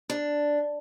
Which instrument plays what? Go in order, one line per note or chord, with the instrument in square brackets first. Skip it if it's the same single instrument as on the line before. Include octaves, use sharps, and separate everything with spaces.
[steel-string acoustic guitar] D4